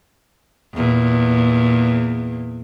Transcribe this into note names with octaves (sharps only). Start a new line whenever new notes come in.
E2 A#2